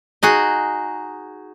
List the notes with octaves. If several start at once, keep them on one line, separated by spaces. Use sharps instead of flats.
D#4 F#4 G#4